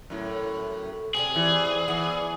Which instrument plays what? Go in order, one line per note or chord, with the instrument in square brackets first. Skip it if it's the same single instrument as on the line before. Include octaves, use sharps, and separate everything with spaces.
[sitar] F#2 A2
[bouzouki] C3 C4 D4 [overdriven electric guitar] G#4
[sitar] E3
[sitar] E3 [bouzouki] B3 D4